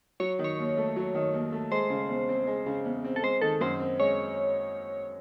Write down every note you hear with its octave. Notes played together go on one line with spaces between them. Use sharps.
F#3 C#5
D#3
C#5
D#2
A3
F#3
D#3
D#2
A3
G#3 C5
C#3
E2
C4
G#3
C#3
E2
C4
A4
G#3 C5
D#3 A4
F#2 C5
C4
G#3 C#5